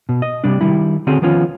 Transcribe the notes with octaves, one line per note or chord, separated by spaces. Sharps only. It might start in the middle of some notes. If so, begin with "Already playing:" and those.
B2
D#5
C3 G3 D4
D#3 G3 E4
D3 C4 C#4 F#4 G#4
D#3 F3 B3 C#4 F4